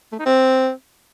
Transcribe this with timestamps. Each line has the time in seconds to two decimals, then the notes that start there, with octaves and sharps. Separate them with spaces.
0.12 A3
0.19 D#4
0.26 C4